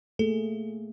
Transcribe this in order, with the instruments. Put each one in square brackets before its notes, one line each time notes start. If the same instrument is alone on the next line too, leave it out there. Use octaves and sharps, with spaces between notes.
[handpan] A3 A#3 G#4 [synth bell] A4